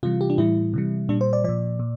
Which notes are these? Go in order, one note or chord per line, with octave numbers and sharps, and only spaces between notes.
C3 E3 G3 F4
G4
D4
A2 E3 G3 E4
C3 E3 G3
A#2 G3 D4
C5
D5
A#2 F3 D5
A#2